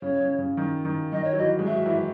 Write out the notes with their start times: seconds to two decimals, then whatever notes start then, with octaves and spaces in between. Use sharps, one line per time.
0.02 C#3 C#5
0.20 C#3
0.39 C#3
0.57 D#3
0.85 D#3
1.12 D#3 D#5
1.24 C#5
1.33 F#3
1.38 E3 D#5
1.59 G#3
1.66 F#3 E5
1.86 E3